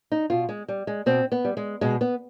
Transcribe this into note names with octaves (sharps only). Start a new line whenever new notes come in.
D#4
B2 F4
G#3
G3
G#3
B2 C4
B3
G3
G#3
B2 G#3
B3